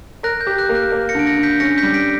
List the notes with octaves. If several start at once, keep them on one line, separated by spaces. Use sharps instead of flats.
A#4 F#6 A#6
G6
G4
F#6
A#3
F#6
A#3 F#6
A#6 C#7
D3 D7
A#6 C#7
D3
G6 B6
C#4 A#6 C#7
G6 B6
G3
B6 D7